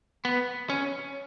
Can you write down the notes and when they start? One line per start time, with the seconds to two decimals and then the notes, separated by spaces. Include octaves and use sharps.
0.25 B3
0.70 C#4